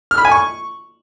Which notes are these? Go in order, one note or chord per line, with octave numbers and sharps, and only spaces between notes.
F6
B5
G#5
C#6